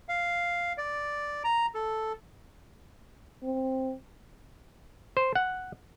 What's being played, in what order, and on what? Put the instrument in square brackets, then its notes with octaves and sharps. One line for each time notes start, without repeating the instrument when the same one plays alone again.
[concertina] F5
D5
A#5
A4
[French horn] C4
[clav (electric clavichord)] C5
F#5